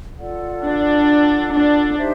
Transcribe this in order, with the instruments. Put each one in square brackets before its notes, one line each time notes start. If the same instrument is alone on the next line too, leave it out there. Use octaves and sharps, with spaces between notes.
[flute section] F4 A4 D5 F#5
[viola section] D4
D4
[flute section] D#4 G4 C5 E5